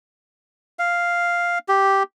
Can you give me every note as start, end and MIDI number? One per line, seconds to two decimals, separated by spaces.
0.79 1.59 77
1.69 2.03 67